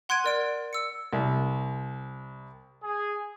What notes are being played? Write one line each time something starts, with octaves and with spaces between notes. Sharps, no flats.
F#5 C6 F#6 G#6 D7 D#7
A#4 D5 D7
E6 C#7
C2
G#4